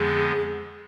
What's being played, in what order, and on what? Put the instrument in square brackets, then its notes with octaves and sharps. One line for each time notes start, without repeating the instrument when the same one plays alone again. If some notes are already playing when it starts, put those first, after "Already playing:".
Already playing: [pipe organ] F2 D3 F3 G#3 B3 [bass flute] G#4